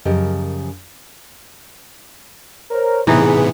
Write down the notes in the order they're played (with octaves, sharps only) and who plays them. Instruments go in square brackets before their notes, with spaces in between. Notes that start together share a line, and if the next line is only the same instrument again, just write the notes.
[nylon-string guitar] F#2 C#3 F3 G4 A#4 D#5
[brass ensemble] A#4 C5 C#5
[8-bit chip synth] A2 C3 B3 [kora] E3 D#4 [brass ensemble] G#4 B4